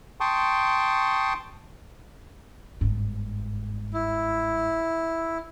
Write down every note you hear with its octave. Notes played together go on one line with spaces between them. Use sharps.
G5 A5 C6 C#6 D#6
G1 G#2
E4